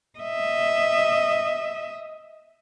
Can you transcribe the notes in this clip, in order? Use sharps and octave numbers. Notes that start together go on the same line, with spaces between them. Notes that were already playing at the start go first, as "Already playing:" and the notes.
D#5 E5